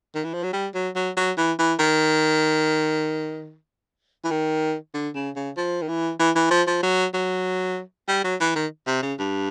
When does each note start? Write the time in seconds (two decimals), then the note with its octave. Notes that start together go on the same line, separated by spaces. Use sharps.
0.15 D#3
0.24 E3
0.34 F3
0.43 F#3
0.53 G3
0.75 F#3
0.96 F#3
1.17 F#3
1.37 E3
1.59 E3
1.79 D#3
4.25 E3
4.31 D#3
4.94 D3
5.15 C#3
5.36 C#3
5.57 F3
5.82 D#3
5.88 E3
6.19 E3
6.36 E3
6.51 F3
6.67 F3
6.83 F#3
7.14 F#3
8.08 G3
8.24 F#3
8.40 E3
8.56 D#3
8.87 C3
9.02 C#3
9.19 G2